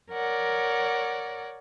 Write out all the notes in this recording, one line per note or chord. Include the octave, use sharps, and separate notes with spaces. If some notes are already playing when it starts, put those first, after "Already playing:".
A#4 C#5 D5 F#5